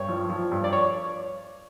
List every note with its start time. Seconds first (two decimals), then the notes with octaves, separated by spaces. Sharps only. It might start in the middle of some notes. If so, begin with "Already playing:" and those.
Already playing: G2 C#5
0.08 F3
0.29 F3
0.52 G2
0.64 D5
0.73 C#5